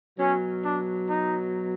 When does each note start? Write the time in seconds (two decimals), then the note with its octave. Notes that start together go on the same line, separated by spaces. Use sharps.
0.18 B2 F#3 C#4
0.63 D4
1.07 D#4